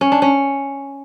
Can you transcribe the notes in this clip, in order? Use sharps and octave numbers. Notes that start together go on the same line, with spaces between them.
C#4
D4
C#4